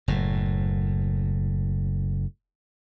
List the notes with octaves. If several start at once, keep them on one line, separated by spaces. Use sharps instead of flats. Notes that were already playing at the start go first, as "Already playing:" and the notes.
F#1 A2